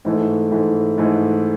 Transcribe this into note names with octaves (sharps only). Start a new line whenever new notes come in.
G#2 E3 A3
G#2 E3 A3
G#2 E3 A3